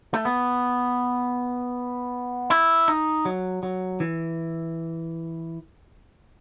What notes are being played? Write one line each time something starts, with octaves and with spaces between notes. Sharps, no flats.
A3
B3
E4
D#4
F#3
F#3
E3